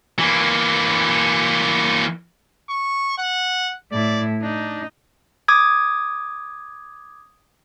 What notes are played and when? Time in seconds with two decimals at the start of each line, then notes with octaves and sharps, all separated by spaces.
0.19 E3 A#3
2.70 C#6
3.18 F#5
3.92 A2 E4 D5
4.43 D4 D#4
5.48 D6 D#6 G#6